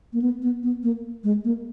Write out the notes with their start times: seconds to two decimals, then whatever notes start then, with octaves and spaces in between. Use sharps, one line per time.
0.13 A#3
0.22 B3
0.42 B3
0.63 B3
0.83 A#3
1.24 G#3
1.44 A#3